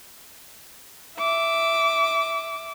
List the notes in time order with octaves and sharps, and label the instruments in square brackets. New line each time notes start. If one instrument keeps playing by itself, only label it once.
[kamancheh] E5 D6